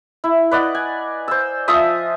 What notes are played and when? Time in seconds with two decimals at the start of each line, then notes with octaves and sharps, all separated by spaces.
0.24 E4
0.51 B4 D5 D#5 F#5
0.75 G#5
1.28 C5 E6
1.68 F3 F4 E5 D#6